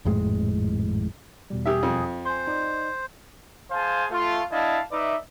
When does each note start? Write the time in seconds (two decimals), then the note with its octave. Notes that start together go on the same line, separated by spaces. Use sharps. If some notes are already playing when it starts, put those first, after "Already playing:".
0.05 G#1 F2 A2 G#3
1.50 E2 B2 G3
1.66 G4 G#4 E5
1.83 F2
2.25 C5 G#5 C6
2.47 D#4 D5 D#5
3.71 G#4 C5 F5 G#5 A5
4.10 A3 F4
4.51 D4 E4 D#5 F5 A5
4.91 D#4 B4 D5 E5